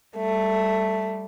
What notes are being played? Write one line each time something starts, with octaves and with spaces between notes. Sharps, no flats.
G3 A3